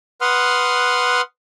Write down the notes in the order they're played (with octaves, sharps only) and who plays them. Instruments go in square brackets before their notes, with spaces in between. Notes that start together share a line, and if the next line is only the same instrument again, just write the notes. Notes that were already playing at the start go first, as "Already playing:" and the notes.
[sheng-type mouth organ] B4 F#5 C6 D#6 F6